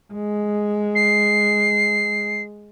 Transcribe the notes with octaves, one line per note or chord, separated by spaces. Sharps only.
G#3
C7